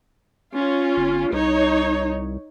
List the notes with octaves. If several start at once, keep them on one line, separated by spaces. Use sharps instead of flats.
C#4 F4
G1
C2 D#4 C#5